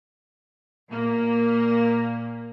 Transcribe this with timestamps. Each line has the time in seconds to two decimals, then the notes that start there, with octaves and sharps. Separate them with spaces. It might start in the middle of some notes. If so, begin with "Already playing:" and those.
0.88 A#2 A#3